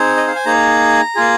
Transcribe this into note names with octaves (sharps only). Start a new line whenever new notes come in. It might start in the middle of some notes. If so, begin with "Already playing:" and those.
Already playing: C4 D#4 G#4 C5
D#5
F5
G#5
A#3 D#4 G#4 A#5
A#3 F4 G#4